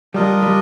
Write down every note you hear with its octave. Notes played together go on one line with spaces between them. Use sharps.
G3 D4 F4 A#4 D#5
G3